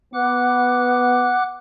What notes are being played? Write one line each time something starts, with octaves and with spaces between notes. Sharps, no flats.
B3 F#5 D6 F#6